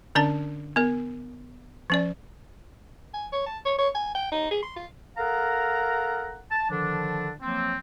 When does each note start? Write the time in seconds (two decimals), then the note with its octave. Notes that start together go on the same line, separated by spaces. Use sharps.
0.15 D3 C#4 D4 D5 A5
0.76 B3 A#4
1.90 F3 C#4 D5
3.14 G#5
3.32 C#5
3.46 A5
3.65 C#5
3.78 C#5
3.95 G#5
4.15 G5
4.32 D#4
4.51 G#4
4.63 C6
4.76 F4
5.18 A4 A#4 F5 F#5 A#5
6.51 A5
6.70 D3 D#3 F3 D4
7.42 F3 F#3 A#3 C4